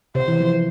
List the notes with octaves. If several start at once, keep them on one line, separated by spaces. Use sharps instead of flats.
C3 C5
E3
F3